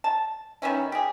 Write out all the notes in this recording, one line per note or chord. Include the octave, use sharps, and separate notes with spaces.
A5
D#3 B3 C#4 E4
G4 G#4